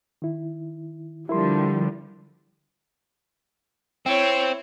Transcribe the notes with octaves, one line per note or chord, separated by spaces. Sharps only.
D#3 E4
D3 F3 G3 E4 A#4 C6
C4 E4 C#5